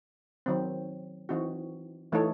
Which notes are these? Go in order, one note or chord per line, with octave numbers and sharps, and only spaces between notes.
D#3 F#3 C4
E3 C4 D#4 F#4
E3 A3 D#4 A4 C#5